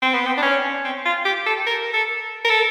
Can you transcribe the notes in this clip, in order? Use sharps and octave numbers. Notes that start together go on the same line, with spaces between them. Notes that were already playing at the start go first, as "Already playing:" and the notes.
C4
B3
C4
D4
C#4
C4
F4
G4
A4
A#4
A4
A#4
A4